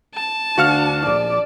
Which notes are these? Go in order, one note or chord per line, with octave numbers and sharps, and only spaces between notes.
A5
D2 D4 F#4 F5 F6 C#7
A#1 D5